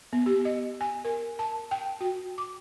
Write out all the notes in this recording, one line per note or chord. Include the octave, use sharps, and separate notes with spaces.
B3
G4
D#5
G#5
A#4
A5
G5
F#4
D6